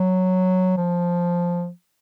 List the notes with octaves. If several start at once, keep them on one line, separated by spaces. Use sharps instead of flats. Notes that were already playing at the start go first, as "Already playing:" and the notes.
Already playing: F#3
F3